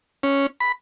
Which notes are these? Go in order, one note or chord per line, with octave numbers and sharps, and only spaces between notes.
C#4
B5